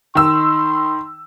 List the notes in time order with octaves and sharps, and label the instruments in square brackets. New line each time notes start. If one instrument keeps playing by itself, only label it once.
[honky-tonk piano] D#3 E6 [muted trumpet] C6